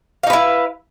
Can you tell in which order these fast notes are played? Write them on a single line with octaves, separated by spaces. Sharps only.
F5 D#4 B4 E4